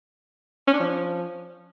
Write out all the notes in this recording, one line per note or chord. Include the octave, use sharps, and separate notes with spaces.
C#4
D4
F3